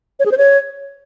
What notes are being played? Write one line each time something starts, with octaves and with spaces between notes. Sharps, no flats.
C#5
G#4
C5
C#5